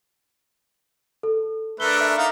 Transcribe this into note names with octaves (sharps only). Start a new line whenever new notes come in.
A4
A3 D4 A#4 B4 G7
E5
D#4 F5